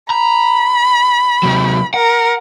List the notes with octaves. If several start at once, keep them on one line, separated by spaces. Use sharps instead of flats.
A#5 B5
C3 F#3
A#4 F#5